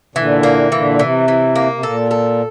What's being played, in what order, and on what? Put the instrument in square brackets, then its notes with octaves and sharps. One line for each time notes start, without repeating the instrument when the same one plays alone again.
[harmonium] A#2 D3 [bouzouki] E3
[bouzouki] A#3
[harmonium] A#2 D3 [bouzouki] E3
[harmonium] C3 [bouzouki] E3
[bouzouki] E3
A#3
[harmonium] C3
[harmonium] A#2 [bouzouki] A4
[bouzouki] A4